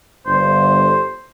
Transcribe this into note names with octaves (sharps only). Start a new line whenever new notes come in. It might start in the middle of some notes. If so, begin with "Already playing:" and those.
G1 C5